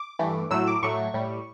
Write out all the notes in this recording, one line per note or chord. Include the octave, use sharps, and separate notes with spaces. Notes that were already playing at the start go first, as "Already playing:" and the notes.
Already playing: D6
G2 E3 A3
A2 F#3 A3 E6
D6
A2 F#3 A3 C#6
A2 G3